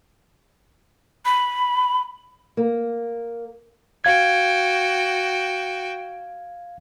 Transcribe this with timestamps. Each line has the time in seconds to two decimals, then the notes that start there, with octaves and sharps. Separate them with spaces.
1.25 B5
2.57 A#3
4.04 F#4 F5 G5 G#6